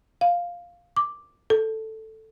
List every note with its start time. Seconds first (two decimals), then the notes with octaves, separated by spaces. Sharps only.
0.21 F5
0.97 D6
1.50 A4